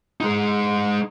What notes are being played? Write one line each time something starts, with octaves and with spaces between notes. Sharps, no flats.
G#3 D#4